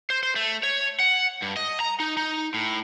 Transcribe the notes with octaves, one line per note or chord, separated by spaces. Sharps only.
C5
C5
A3
C#5
F#5
G2
D#5
A#5
D#4
D#4
A2